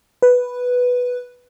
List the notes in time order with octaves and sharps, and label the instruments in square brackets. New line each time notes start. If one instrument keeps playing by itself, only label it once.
[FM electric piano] B4